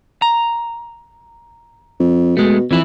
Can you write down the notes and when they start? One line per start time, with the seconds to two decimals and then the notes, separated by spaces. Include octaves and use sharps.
0.22 A#5
2.00 F2
2.37 B2 G#3 A3
2.71 F2 E3 E4